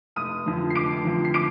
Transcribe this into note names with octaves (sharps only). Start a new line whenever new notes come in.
F1 D#6 D#7
F2 D3 F3
C7
F1 D6 D7
F2 D3 F3
C7
D6 D7